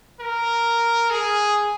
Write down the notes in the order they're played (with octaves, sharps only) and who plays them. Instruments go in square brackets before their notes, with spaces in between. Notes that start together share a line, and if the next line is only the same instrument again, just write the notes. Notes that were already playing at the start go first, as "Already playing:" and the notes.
[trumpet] A#4
G#4